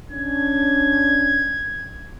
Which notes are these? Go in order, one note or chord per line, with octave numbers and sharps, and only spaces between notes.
C#4 D4 G#6